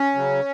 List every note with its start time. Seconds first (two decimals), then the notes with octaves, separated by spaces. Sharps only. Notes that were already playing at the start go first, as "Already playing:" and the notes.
Already playing: C#4
0.15 C#3 F#3